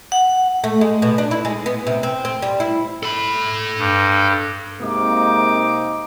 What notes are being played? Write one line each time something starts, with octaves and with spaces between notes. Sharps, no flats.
F#5
A3
G#3
B2
D4
E4
G#3
B3
C3
C4
C4
G3
E4
A4 B5
G2
C3 G#3 A#3 C4 D#4 D6